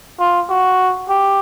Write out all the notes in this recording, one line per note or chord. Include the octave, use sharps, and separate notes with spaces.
F4
F#4
G4